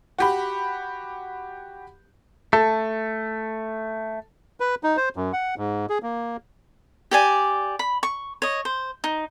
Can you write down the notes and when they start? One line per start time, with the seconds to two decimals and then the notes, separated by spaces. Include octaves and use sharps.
0.18 F#4 G4 B5
2.53 A3 A4
4.60 B4
4.83 D#4
4.97 C5
5.16 F#2
5.33 F#5
5.58 G#2
5.90 G#4
6.03 A#3
7.11 G4 D5 G#5
7.79 B5
8.03 C#6
8.42 C#5 D#5
8.65 C5
9.04 D#4